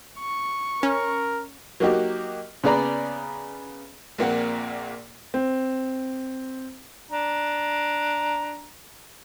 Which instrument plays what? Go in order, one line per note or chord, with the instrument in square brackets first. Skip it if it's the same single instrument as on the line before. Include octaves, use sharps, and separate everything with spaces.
[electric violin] C#6
[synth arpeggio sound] C#4 [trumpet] A#4
[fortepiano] F#3 A#3 D#4 F#4 G4
C#3 B3 G#4 D5 A#5 B5
[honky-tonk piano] A#1 A#2 A#3 C4 F#5
[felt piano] C4
[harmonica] D4 A#5